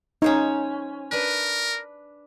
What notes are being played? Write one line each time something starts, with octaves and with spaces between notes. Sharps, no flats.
C#4 D#4 C5 C#5
D4 A#4 B4